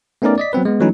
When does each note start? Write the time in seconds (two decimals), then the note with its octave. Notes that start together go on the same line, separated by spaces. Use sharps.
0.22 A3 B3 C#4 D#4 A#4 D5
0.38 D5 D#5 B6
0.53 F#3 B3 C4 B4
0.65 G#3 B3
0.80 E3 F#3 A3 C#4 D#4 E4